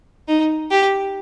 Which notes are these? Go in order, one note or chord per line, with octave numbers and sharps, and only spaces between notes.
D#4
G4